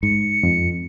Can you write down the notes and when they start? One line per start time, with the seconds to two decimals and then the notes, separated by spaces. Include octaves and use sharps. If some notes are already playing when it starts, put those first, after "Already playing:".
0.03 G#2 C#7
0.43 F2